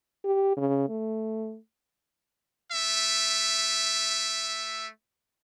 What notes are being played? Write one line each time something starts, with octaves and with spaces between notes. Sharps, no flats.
G4
C#3
A3
A3 E5